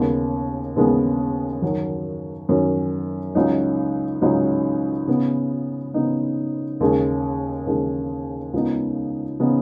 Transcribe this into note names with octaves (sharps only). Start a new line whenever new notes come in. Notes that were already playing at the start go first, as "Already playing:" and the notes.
Already playing: D#2 C#3 G#3 B3
D#2 C#3 G#3 B3
F#2 D#3 F#3 C#4
F#2 D#3 F#3 C#4
C#2 C#3 F#3 D#4
C#2 C#3 F#3 D#4
C#3 B3 D#4
C#3 B3 D#4
D#2 C#3 G#3
D#2 C#3 G#3
C#2 C#3 B3 D#4
C#3 B3 D#4